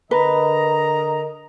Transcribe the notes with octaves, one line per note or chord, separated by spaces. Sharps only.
D3 A#4 B4 D#5 A#5